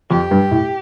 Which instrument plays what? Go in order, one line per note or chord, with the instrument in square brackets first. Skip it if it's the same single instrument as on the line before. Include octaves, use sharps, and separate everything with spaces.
[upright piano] F2 [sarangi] G4
[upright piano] G2
A2